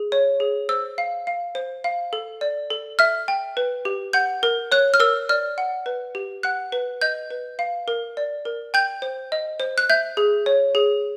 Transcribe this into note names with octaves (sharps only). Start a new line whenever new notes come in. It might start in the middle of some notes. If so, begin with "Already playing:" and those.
Already playing: G#4
C#5
G#4
C5 E6
F5
F5
C5
F5
A4
D5
A4
E5 F6
G5
B4
G4
F#5 G6
A#4
C#5 F#6
F6
A#4 E6
D5 F6
F#5
B4
G4
F#5 F#6
B4
D#5 G6
B4
F5
A#4
D5
A#4
G5 G6
C5
D#5
C5
F#6
E5 G6
G#4
C#5
G#4